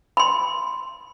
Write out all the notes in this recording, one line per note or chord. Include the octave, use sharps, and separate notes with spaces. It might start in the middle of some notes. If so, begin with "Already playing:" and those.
B5 C6